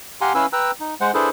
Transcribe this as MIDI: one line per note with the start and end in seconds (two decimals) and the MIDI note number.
0.21 0.33 67
0.21 0.33 77
0.21 0.33 78
0.21 0.33 80
0.21 0.33 82
0.21 0.33 84
0.35 0.46 61
0.35 0.46 64
0.35 0.46 71
0.35 0.46 77
0.35 0.46 80
0.35 0.46 88
0.53 0.71 71
0.53 0.71 79
0.53 0.71 82
0.53 0.71 88
0.53 0.71 90
0.80 0.94 63
1.01 1.11 56
1.01 1.11 72
1.01 1.11 78
1.14 1.29 62
1.14 1.29 64
1.14 1.29 68
1.14 1.29 69
1.14 1.29 71
1.14 1.29 72